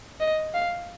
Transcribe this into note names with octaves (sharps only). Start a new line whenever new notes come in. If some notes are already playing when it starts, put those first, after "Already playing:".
D#5
F5